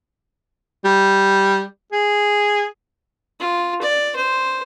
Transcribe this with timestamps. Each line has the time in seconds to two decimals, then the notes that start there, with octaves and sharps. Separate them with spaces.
0.84 G3
1.92 G#4
3.40 F4
3.81 D5
4.16 C5